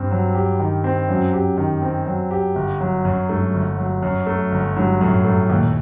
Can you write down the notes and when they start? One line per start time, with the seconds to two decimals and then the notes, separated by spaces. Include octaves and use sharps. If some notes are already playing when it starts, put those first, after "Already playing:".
Already playing: G2 C4
0.11 F#3
0.35 G4
0.59 D#3
0.84 C4
1.09 F#2 F#3
1.33 G4
1.58 D#3
1.82 C4
2.06 F#3
2.31 G4
2.55 G1
2.81 F#3
3.05 F#2
3.29 G2 A3
3.54 G1
3.78 F#3
4.02 F#2
4.26 A3
4.52 G1
4.76 G2 F#3
5.01 F#2 A2
5.24 A2 A3
5.49 D#2 A#2